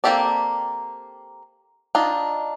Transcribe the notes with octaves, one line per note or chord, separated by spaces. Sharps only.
A#3 C4 G4 A4 D5
D4 D#4 F4